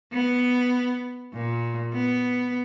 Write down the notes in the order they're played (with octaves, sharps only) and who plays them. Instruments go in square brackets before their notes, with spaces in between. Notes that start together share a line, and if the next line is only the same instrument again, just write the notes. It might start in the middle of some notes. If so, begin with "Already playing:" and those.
[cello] B3
A#2
B3